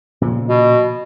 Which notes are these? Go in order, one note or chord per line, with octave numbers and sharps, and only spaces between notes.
A#2 C#3 F3
B2